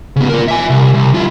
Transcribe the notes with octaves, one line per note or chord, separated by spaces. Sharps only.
C#3 B3
F4 A#4
E5 G#5
C2
C2
E4 F4